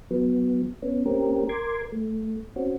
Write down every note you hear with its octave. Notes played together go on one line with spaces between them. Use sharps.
F#3 B3
B3 C#4
A#3 C4 C#4 G4 A#4
A#4 C6 D6 G#6
A3
C4 C#4 F#4